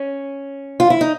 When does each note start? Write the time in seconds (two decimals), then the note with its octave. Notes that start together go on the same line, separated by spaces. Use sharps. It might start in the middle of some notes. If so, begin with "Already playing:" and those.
Already playing: C#4
0.80 F4
0.90 E4
1.01 D#4